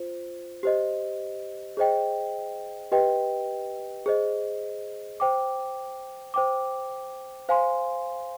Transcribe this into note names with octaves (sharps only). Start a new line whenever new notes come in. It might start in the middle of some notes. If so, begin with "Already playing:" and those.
Already playing: F4 C5
G4 C5 D#5
G#4 C5 D#5 G5
G4 B4 D#5 G5
G#4 C5 D#5
C5 G5 D6
C5 G5 D6
C5 F5 G#5 C6